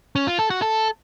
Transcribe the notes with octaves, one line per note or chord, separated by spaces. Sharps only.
C#4
F4
A4
F#4
A4